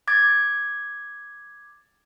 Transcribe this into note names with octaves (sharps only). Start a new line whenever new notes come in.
D6 G#6 A6